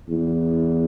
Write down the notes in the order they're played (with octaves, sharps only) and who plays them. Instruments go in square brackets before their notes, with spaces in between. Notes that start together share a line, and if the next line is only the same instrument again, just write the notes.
[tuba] E2